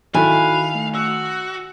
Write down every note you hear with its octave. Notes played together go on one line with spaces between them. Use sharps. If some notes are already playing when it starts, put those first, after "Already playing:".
D#3 E4 F#4 A4 F5 G#5 B5 F#6
A3
F#4 E6